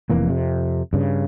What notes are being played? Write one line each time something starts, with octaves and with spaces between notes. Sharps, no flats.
F1 F2 E3 A#3
F2 C3
G2 C#3